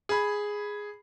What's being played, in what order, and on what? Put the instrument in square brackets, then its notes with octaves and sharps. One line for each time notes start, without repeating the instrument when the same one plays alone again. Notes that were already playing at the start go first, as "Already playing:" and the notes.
[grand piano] G#4 B5